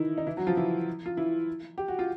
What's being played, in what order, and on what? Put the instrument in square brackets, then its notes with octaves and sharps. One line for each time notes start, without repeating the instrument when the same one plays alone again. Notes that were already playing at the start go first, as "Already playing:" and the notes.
Already playing: [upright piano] D#3 E3 D#4 E4
D#4
E3 E4
F#3 F#4
F3 F4
E3 E4
F4
E3 E4
G4
F#4
F4